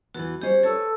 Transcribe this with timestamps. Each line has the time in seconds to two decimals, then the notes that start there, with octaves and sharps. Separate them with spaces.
0.14 E2 E3 F#4
0.42 G3 C#4 G4 C5 D#5
0.63 A4 B4 C#5 A5 E6